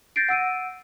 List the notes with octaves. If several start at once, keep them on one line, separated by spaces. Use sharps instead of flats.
G6 A6 A#6 C7 D7
F#5 E6 D7 D#7